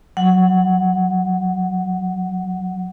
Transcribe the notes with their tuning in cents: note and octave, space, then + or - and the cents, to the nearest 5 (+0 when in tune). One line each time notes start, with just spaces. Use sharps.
F#3 +0 F#5 +0